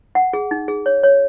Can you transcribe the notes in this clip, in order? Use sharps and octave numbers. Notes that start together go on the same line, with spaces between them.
F#5
G#4
D#4
G#4
C#5
C#5